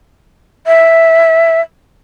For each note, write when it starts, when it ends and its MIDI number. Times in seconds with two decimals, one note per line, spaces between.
0.67 1.61 76